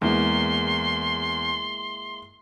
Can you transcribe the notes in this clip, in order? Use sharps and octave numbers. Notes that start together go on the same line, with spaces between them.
E2 G#3 A#3 E4 C6